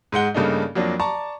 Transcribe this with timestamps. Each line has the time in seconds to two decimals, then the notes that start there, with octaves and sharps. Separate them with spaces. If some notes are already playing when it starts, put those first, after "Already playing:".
0.12 G#2 G#3 F#5 G7
0.34 G2 C#3 A3 A#3 D4 D#4
0.76 F2 F#3 A#3 D4
0.99 D5 A5 A#5 C#6